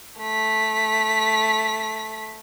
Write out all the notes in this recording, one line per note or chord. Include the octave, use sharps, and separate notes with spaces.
A3 B6